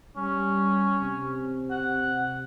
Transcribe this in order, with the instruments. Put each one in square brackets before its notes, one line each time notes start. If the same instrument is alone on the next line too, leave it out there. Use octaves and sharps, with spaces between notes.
[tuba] G3 [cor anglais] C#4
[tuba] C3
[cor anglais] F#5